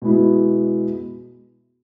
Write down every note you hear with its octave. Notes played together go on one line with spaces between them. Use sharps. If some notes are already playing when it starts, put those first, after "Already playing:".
B2 G#3 B3 E4